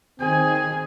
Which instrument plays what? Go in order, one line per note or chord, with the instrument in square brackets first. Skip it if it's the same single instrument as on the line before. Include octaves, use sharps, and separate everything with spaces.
[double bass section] D#3 [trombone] C4 [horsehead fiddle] G#4 [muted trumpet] G#5